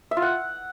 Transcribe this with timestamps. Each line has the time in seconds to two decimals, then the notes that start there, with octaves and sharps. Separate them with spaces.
0.11 E5
0.17 F4
0.22 F#5